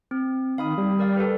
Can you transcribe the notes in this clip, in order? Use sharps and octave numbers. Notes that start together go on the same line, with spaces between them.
C4
D#3 F5 B5 D#6
G3
A#4 D5 F5
A4 B4